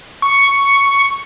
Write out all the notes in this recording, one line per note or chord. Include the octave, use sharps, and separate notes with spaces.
C#6